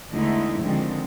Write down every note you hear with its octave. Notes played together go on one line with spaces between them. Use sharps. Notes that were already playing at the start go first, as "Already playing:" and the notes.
E2 D3 G#3 A3 D#4 E4
D3 D#3 F3 G#3 C4